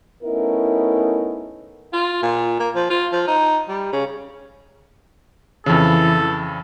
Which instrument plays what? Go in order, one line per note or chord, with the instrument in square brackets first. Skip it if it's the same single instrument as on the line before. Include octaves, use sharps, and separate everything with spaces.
[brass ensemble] A3 B3 C#4 D#4 E4 A#4
[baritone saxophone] F4
A#2
A#3
F3
F4
F3
D#4
G3
C#3
[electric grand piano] F2 C#3 [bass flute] E3 [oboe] A4